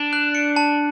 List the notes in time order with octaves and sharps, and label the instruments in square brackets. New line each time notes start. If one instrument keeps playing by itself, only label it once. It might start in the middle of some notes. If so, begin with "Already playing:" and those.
Already playing: [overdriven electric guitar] D4
[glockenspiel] F#6
C#7
A5